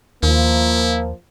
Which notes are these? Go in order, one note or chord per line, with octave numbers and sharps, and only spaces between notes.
D#2 F3 A#3 E4